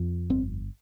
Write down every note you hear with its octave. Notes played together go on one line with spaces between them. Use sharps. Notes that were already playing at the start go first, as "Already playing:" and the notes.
Already playing: F2
G1 C4